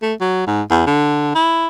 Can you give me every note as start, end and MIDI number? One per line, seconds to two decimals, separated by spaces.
0.02 0.13 57
0.21 0.45 54
0.47 0.62 44
0.70 0.83 40
0.87 1.33 50
1.35 1.67 64